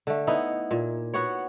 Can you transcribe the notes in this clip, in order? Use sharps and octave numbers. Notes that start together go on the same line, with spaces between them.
D3 A3
B3 D#4 E4
A#2
B3 F#4 C#5